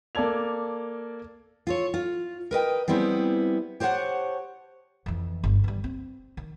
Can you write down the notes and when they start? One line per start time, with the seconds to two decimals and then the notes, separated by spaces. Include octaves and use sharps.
0.15 A#3 A4 D5 A5 G#6 F7
1.67 F4 A4 C#5
1.94 F4
2.51 A#4 B4 D#5 G5
2.88 G3 B3 C4 E4 G#4
3.80 G4 C5 C#5 D#5 F#5 A5
5.06 F2 E3
5.44 G1
5.64 E3 G3
5.84 C4
6.37 D#3